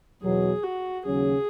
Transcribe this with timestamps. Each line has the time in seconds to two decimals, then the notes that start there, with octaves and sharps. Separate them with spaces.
0.22 E2 B2 F#3 G#4
0.63 F#4
1.05 D#2 C#3 F#3 C#4 G#4